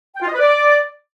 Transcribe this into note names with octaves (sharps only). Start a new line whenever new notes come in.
G5
F4
D#5
B4
D5